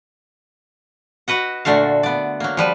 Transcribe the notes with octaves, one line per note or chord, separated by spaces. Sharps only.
F#4 B4 D#5 F#5
A#2 D3 A3 F#4 F5
B3 D5
F#3 A#3
F3 G3 B4